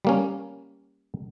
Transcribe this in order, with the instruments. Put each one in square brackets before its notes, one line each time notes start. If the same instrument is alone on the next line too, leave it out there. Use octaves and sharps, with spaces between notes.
[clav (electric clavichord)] G3 A#3 C#4